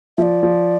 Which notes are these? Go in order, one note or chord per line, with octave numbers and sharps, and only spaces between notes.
F3 D5 E5
F3